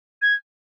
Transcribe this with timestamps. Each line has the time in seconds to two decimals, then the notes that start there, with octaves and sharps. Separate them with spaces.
0.22 G#6